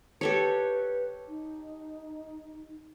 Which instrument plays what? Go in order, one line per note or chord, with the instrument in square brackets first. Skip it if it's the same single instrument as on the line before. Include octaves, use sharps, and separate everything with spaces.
[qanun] G4 A4 C#5 [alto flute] B4
[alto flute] D#4